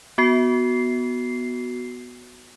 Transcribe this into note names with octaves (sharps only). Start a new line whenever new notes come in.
B3 F#4 C7